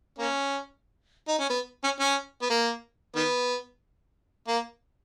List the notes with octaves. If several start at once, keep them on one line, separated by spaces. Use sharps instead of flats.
A#3 C#4
D#4
C#4
B3
C#4
C#4
B3
A#3
D#3 B3
A#3